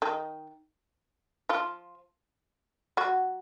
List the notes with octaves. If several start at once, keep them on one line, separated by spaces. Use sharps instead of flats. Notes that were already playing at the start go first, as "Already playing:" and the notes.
D#3 D#4
F3 F4
F#3 F#4